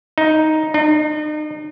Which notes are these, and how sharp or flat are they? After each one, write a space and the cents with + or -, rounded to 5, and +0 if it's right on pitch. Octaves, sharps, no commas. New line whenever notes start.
D#4 +5
D#4 -40